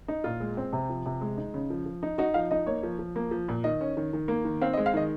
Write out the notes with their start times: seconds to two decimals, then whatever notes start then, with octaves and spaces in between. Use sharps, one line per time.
0.08 D#4
0.24 A#2 F4
0.40 G#3
0.57 C4
0.73 C3
0.89 F3
1.06 C3
1.21 G#3
1.37 D#4
1.54 C#3
1.70 F3
1.86 F3
2.03 D#4
2.18 D#4 F#4
2.34 F3 F5
2.51 D#4 D#5
2.66 A#3 C#5
2.83 F3
2.99 F3
3.16 A#3
3.31 F3
3.49 A#2
3.64 D#3 D#5
3.81 C#4
3.97 D#3
4.13 D#3
4.28 A#3
4.45 D#3
4.61 C4 F5
4.74 D#5
4.77 G#3
4.86 F5
4.94 D#3 D#5